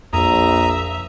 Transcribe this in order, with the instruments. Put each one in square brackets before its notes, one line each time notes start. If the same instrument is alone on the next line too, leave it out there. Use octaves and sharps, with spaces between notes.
[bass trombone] A#1 [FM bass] F2 [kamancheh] E5 [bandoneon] A#5 D#6